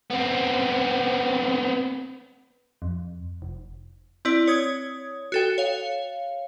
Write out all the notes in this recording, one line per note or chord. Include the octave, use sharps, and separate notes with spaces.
B3 C4
F2
F1
C4 E4 D5
C#5 D#6 G#6
F#4 A4 G5
C#5 F5